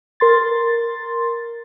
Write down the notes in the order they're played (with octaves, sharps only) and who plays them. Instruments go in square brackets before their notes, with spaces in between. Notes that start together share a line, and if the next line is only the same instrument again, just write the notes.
[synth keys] A#4 C6 A6